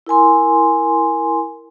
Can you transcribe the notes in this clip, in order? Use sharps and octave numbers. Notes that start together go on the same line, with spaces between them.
E4 A#4 G#5 C6